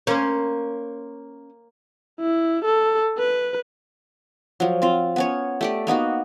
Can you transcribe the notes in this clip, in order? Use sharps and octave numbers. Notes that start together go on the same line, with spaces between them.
A#3 C#4 C5
E4
A4
B4
F3 F#3
C4 F4
B3 C#4 C#5
A3 G4 D5
A#3 B3 D#4 F#4